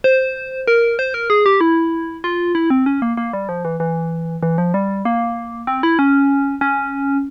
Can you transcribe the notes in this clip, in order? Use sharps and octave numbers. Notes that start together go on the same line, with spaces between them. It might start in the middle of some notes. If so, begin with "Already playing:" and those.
C5
A#4
C5
A#4
G#4
G4
E4
F4
E4
C4
C#4
A#3
A#3
G3
F3
E3
E3
E3
F3
G3
A#3
C4
E4
C#4
C#4